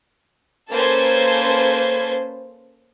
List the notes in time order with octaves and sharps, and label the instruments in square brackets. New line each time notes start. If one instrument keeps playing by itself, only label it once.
[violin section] A#3 C#4 A4 B4 C5 G#6